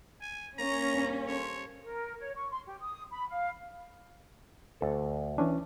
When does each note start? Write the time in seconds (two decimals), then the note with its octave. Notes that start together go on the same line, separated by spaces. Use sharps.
0.21 G#5
0.58 A#3 C#4 A#5
0.92 G2
1.27 A4 C5 C#5 G#5
1.83 A#4
2.20 C#5
2.36 C#6
2.52 C6
2.67 G4
2.81 D#6
3.11 B5
3.30 F5
4.81 D2 A4
5.38 E3 C#4 D4 G#5